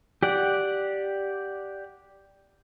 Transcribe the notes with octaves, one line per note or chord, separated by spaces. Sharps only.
G4 D5 F#5